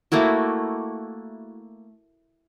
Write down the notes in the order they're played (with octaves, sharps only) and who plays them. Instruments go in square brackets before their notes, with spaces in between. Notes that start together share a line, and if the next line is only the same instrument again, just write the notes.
[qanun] A3 A#3 E4 F#4